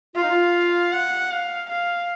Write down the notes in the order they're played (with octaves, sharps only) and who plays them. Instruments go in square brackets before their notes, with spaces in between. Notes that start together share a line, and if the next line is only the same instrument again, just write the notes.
[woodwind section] F4 [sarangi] F5
[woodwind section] D#4
F4
[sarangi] F#5
F5
F5